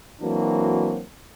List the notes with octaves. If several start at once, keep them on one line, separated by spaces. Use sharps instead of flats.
E3 F#3 A#3 C4 D4 F#4